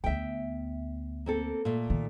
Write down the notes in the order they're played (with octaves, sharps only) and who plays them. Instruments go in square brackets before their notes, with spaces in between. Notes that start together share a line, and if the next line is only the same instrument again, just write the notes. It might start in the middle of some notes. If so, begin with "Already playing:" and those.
[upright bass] D2 B3 [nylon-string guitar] E5 G5
[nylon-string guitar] A#3 C4 A4
A#2 A3
[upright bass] D#3